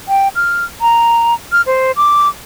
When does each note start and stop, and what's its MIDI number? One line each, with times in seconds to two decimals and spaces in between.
0.08 0.28 79
0.35 0.64 89
0.81 1.34 82
1.52 1.62 89
1.67 1.92 72
1.96 2.28 86